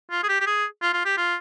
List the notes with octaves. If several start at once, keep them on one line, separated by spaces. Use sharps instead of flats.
F4
G#4
G4
G4
G#4
F4
F4
G4
F4